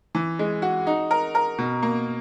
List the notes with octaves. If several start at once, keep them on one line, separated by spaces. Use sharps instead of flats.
E3
G#3
F#4
D#4
A#4
A#4
B2
A#3